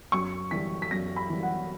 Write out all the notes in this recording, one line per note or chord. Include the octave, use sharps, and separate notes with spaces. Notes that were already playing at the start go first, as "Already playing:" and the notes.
F#2 C#6
E3 G3 B6
B6
F#2 A#6
B5
E3 G3
F#5